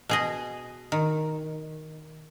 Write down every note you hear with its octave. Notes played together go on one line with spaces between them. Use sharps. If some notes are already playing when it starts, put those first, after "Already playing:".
B2 G#4 D#5
D#3